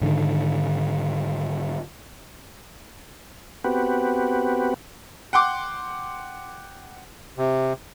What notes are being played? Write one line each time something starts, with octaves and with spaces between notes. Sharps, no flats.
G#2 D3 D#3
B3 C4 F#4 G4 B4
F#5 G5 C6 D6
C3